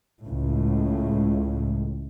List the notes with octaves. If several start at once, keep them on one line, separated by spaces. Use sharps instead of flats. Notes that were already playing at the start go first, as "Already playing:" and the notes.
C#2 A2